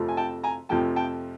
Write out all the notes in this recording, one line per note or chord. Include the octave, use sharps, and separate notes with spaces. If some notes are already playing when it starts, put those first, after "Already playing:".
Already playing: F2 C3 F3 A3
G#5
G5 A5
G#5 A#5
F2 C3 F3 A3 G5 A5
G5 A5